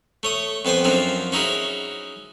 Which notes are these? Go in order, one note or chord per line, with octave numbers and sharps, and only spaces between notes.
A3 C#5 D#6
F2 B3 C5 G5 G#5
F#2 F3 F#3 C4 D4
C#4 D#4 E4 F#4 G#4